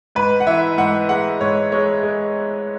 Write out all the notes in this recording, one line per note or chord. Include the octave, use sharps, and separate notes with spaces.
G#2 B4
F#5
E3 E5
G#2 F#5
G#3 F#5
G#2 C#5
G#3 C#5
G#3